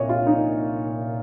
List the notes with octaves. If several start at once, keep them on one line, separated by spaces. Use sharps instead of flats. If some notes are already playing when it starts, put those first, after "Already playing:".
Already playing: C2 A#2 C#5 D#5
F4
D#4